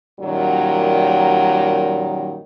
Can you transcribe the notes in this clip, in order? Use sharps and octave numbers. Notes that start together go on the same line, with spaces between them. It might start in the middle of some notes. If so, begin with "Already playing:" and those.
F#2 A#2 D#3 F#3 G3